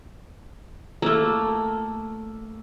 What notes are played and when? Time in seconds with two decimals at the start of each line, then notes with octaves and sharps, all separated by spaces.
1.02 A3 A#3